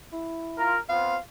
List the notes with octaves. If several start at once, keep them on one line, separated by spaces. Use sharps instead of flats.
E4
F4 A#4
B3 C4 F4 F5